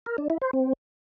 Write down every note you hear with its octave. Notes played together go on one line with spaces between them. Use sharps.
A#4
D4
E4
C5
C4